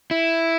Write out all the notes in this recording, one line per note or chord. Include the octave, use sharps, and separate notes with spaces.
E4